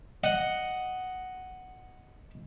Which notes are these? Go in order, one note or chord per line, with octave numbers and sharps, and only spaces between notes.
D#5 F#5